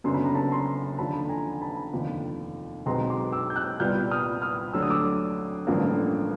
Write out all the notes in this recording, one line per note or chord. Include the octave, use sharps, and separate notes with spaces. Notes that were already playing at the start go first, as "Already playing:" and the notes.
F#1 F#2 D3 F#3 B3 C6
B5
A#5
A5 B5
A#5 C6
D#2 D3 F3 A5 B5
G#5 A#5
A5 B5
F1 D#2 D3 F3
B1 B2 G#3 C4 A#5 C6
C6 D6
D6 E6
G6
E6 F#6
C2 A#2 G3 B3 F6 G6
D#6 F6
D#6 F6
D2 D3 F#3 E6
D#6
D6 E6
A1 G2 D3 F3 A#3